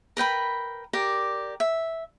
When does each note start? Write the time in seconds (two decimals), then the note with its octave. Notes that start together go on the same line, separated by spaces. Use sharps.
0.17 A#4 B4 G5 B5
0.93 G4 A#4 D5
1.60 E5